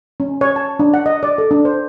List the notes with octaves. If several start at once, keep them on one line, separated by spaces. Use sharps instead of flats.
C#4
C#5
A5
D4
F#5
D#5
D5
A4
D4
C5